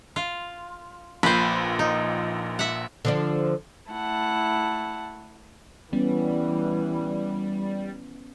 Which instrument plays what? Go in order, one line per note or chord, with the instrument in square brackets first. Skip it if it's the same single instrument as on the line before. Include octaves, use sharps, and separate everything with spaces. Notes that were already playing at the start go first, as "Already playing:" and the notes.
[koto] F4
[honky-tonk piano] A#1 A#2 [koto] B4 C5
[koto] D#4
E5 F#5
[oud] D3 F3 D4
[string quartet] A3 E4 F#5 A5
[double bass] E3 [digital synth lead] G3 [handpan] B3 C#4